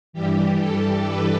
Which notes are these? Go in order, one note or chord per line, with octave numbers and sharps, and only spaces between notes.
G2 E3 G3 G4
A4
B4